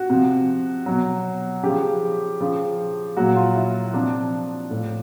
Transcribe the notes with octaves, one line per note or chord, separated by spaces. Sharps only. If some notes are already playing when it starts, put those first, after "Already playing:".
Already playing: F#4
C3 F3
B2 F#3
C#3 F3 G4
C#3 F3
A#2 F#3 F#4
F4
E4
C3 F3 D4
A2 F3